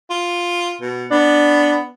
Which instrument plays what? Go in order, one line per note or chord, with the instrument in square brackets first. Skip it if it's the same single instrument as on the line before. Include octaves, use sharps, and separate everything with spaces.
[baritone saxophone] F4
B2
[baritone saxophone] B3 [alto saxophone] D4